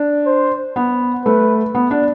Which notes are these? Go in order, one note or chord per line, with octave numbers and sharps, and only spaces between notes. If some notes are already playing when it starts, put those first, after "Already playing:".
Already playing: D4
C5
B3
A3 B4
B3
D4